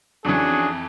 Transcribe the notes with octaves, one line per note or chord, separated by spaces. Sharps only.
F2 E3 C#4 D4 F#4 G#4